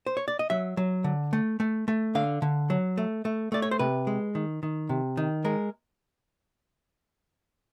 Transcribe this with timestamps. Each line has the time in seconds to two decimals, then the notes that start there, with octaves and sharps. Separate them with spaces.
0.07 C5
0.17 C#5
0.28 D5
0.39 D#5
0.50 F#3 E5
0.77 F#3
1.04 D3
1.33 A3
1.60 A3
1.88 A3
2.15 D3 F5
2.42 D3
2.70 F#3
2.97 A3
3.25 A3
3.52 A3 D5
3.62 C#5
3.71 C5
3.79 C3 B4
4.07 G#3
4.35 D#3
4.63 D#3
4.89 C3
5.17 D#3
5.45 G#3 A#4